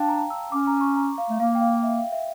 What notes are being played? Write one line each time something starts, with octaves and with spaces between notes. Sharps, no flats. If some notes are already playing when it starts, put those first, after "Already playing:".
Already playing: D4 F5 G5 A5
A#5
E6
C#4 D6
A#5
C#6
A#5
F5
A3
A#3 F5
G5
F5
E5
F5
E5